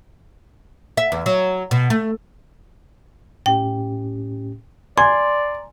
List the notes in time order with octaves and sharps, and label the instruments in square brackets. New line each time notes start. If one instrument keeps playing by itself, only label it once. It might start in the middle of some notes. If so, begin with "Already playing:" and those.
[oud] E5
E2
F#3
B2
A3
[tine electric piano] A2 C#4 G4 [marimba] G5
[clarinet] D5 [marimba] G#5 G#6 [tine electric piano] A#5 [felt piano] C6